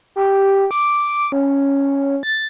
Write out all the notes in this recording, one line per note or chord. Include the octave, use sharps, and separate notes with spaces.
G4
D6
C#4
A6